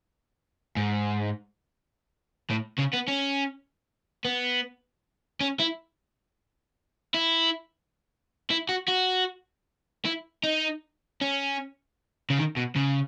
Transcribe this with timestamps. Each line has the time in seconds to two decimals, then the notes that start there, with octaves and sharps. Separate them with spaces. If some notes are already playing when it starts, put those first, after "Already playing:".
0.76 G#2
2.50 A2
2.79 C#3
2.94 B3
3.08 C#4
4.25 B3
5.41 C#4
5.60 E4
7.14 E4
8.50 E4
8.69 F#4
8.88 F#4
10.05 E4
10.44 D#4
11.21 C#4
12.30 C#3
12.37 D#3
12.56 B2
12.76 C#3